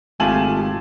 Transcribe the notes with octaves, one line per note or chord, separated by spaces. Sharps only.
G#1 A3 F4 G4 G#5 A5 F#7